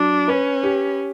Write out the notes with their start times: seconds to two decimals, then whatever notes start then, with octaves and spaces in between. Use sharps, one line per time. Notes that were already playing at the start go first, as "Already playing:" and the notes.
Already playing: F#3 D4
0.28 C#4 B4
0.63 G4